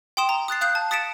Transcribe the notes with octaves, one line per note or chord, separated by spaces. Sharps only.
G5 C6 D#6 E7
A#5
D#6 F#6 A6 C7
F5 D#6 F#6 G6 C7
A5
D#6 A6 B6 C#7 D7 E7